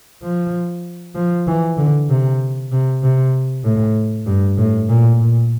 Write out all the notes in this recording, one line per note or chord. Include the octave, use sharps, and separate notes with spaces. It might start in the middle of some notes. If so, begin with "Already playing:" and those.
F3
F3
E3
D3
C3
C3
C3
A2
G2
A2
A#2
A#2